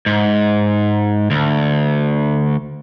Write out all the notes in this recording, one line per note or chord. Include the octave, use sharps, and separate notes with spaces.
G#2
D2